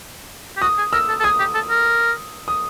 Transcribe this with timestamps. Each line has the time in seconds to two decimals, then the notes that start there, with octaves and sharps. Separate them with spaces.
0.57 G4
0.62 F#4 D#6
0.78 G#4
0.93 A#4 E6
1.09 A4
1.20 A4
1.24 G#4 D#6
1.39 G4
1.55 A4
1.70 A#4
2.48 D#6